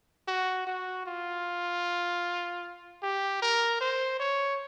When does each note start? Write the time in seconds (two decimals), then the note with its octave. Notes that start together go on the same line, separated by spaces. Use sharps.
0.28 F#4
0.67 F#4
1.06 F4
3.03 G4
3.42 A#4
3.81 C5
4.20 C#5